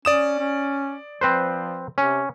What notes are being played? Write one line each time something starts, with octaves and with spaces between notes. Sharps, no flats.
C#4 D5 D#6 E7
C#4
F3 C4 B4 C5
C3 C#4